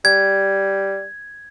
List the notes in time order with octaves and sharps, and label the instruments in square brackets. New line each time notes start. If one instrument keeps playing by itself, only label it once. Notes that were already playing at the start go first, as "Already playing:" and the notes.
[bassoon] G3 [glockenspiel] G#6